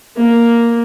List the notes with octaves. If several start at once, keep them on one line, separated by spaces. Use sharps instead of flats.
A#3